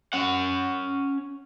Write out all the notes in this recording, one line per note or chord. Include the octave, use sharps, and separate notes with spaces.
C#4 F#5